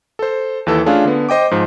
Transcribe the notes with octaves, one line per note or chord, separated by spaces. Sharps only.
A4 C5
D#2 E3 A4 E6
A3 C#4 D4 F4 G#4 F5
D3 B3
C5 D#5 G5 D6
G#2 F3